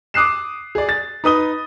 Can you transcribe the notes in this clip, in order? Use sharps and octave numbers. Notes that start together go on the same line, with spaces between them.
D6 D#6 F#6 C7 E7
G#4 D5
A6
D#4 B4 D#6 G7